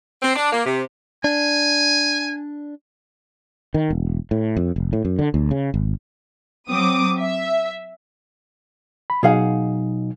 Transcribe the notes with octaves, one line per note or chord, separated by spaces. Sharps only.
C4
D4
A#3
C3
D4 G#5
D#3
E1
A2
F2
F1
A2
F#2
D3
D2
C#3
G#1
F#3 C4 D6 D#6
E5
B5
B2 F#3 D#4 G#4 F5 F#5